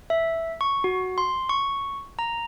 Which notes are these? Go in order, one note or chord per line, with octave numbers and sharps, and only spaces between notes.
E5
C#6
F#4
C6
C#6
A#5